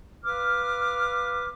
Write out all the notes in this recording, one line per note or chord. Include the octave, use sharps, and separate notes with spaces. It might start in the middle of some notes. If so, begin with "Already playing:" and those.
B4 F5 D6 F6